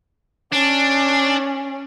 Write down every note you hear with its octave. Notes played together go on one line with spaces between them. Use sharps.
C#4 D4